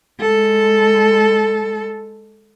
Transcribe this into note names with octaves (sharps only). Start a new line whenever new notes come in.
G#3 A4